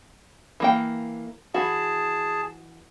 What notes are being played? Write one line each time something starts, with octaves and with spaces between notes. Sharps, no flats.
E3 A#3 G5
E3 F#4 G#4 A5